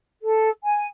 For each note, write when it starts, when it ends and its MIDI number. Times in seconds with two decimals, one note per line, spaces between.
0.22 0.49 69
0.64 0.87 80